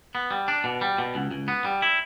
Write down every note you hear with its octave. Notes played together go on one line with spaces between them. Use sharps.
B3
G3
D4
B2
G3
B2
C#2
C#2
B3
G3
E4